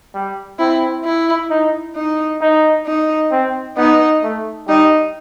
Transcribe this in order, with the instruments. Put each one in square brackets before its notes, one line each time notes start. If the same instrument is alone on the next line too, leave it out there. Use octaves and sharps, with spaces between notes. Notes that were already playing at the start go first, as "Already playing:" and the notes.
[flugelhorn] G3
[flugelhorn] C4 [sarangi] E4
[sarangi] E4
[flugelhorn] D#4
[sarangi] D#4
[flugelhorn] D#4
[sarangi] D#4
[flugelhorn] C4
[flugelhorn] B3 [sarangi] D#4
[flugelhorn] A3
[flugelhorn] G3 [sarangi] D#4